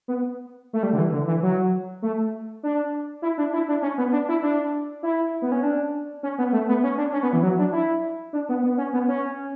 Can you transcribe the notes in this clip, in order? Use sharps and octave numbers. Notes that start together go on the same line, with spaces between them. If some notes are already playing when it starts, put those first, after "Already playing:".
B3
A3
G3
D3
E3
D3
E3
F#3
A3
D4
E4
D4
E4
D4
C#4
B3
D4
E4
D4
E4
B3
C#4
D4
C#4
B3
A3
B3
C#4
D4
C#4
B3
E3
F#3
D4
E4
D4
B3
B3
C#4
B3
C#4